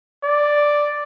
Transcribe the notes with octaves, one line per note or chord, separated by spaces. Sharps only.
D5